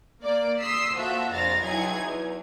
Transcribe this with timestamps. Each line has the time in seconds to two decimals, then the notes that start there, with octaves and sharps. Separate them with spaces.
0.22 A#3 D5
0.60 C6 D#6 E6 B6 C7
0.94 F3 A#3 F#4 A4 E5
1.32 A#1 F2 F5 A6 A#6
1.63 B1 F#3 D#4 E4 G#4 G#6
2.04 E2